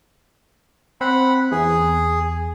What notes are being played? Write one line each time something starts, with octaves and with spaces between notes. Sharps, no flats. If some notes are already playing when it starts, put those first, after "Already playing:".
C4 F#5 B5
E2 G#4